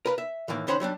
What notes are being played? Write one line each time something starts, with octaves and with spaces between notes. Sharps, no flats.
A#4 B4 F5
E5
A2 D#3 E3 A#3
C#2 D#3 C#4 C5 F#5 B5
F#3 G3 C#4 D4